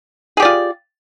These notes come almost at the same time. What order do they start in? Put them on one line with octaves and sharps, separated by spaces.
G#4 G4 D5 F4